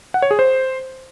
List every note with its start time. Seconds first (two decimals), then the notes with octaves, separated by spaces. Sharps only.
0.14 F#5
0.22 C#5
0.31 G#4
0.39 C5